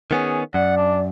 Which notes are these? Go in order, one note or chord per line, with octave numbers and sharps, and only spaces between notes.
D#3 B3 C#4 G#4
F#2 D5 F#5
D4